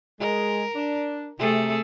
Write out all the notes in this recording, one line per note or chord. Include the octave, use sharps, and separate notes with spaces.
G#3 A#4
D4
C3 A3 G#4 A4